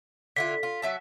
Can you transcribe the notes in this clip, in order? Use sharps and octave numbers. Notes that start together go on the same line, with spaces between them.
D3 E4 F4 B6
F4
F#3 E5 A5